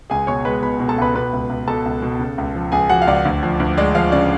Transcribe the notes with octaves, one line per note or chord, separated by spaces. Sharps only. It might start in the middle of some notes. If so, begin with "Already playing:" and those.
C#2 G#4 G#5
B2 C#5 C#6
G#3 B4 B5
B2 B4 B5
B2
A4 A5
C#2 B4 B5
B2 B4 B5
C#2
C#2
B2 A4 A5
C#2
B2
C#3
C#2
F3
C#2 G#4 G#5
F3 F#4 F#5
F5
C#2 D5
D2
F3
D2
G#3 D5
F3 F5
C#3 D5